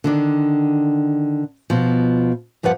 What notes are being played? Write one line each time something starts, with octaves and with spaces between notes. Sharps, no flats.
D3 D#3 D4
B2 F3
G2 F3 G4 B4 F#5